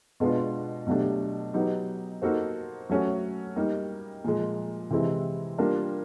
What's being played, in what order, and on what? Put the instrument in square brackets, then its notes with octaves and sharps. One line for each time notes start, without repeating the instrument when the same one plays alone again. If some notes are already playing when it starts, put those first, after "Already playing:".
[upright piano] B2 G#3 B3 D4 F4
B2 F#3 A3 D4 G4
F#3 B3 D#4 G4
A#3 D#4 F#4 A4 C5
F#3 A3 C#4 F#4
G3 A#3 D#4
A#2 F3 G#3
C3 E3 G#3 C4 E4
G3 A#3 D4 F4 A#4